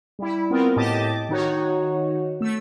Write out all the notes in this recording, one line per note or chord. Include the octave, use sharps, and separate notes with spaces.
G3 E4
B3 C4 F4 A#4
A2 G4 D#5 A5 D6 A6
D#3 D#4 F#4 C#5
A3 E6